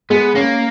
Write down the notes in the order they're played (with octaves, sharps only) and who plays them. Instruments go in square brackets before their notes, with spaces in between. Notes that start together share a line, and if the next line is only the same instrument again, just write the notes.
[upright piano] G#3 [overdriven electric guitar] B3
[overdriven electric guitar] A#3 [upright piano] C#4